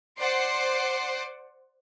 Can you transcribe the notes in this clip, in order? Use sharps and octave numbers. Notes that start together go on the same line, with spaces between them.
C5 D5 F#5 C6 D6 C7